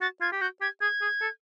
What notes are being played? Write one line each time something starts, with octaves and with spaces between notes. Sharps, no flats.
F#4 A6
F4 G#6
G4
F#4 G6
G4 G#6
G#4 G#6
G#4
A4